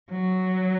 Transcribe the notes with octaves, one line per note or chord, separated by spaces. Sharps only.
F#3